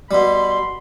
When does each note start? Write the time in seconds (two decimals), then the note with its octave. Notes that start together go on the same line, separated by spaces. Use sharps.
0.11 B2 G3 B5 C6